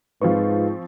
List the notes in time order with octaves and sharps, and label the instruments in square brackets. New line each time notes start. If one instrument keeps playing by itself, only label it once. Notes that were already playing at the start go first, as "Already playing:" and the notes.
[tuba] G#2 [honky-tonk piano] F3 C4 C#6 [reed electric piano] B4 F5